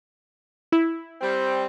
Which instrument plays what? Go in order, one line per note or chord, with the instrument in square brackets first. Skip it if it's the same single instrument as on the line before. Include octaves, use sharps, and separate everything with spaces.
[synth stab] E4
[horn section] G3 C4